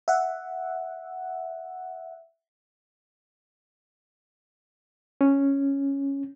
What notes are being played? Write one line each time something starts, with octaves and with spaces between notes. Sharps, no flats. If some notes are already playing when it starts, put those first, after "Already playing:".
E5 F#5
C#4